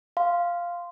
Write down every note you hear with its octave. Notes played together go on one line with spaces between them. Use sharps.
F5 C6